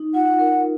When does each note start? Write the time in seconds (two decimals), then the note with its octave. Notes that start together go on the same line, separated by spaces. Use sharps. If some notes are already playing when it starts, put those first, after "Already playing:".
Already playing: D#4
0.14 F4 F#5
0.39 A#4